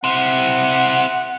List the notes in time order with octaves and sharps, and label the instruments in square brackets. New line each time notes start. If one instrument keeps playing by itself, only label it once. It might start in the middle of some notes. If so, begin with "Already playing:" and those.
[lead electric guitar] C4 E4 [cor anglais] F#5